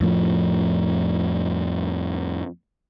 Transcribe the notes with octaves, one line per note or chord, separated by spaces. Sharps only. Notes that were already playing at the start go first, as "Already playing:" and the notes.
F2 A2 F3